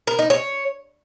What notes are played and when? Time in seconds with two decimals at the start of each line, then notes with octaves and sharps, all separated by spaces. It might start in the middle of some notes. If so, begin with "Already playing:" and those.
0.07 A#4
0.19 D#4
0.30 C#5